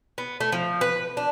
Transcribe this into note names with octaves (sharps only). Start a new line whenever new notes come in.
B3
A3
F3
B4
D4